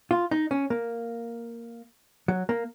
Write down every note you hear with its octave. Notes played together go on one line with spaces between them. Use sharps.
F4
D#4
C#4
A#3
F#3
A#3